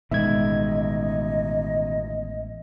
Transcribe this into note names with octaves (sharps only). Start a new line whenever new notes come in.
A1 B2 D#3 G#3 D#5 E5 G#6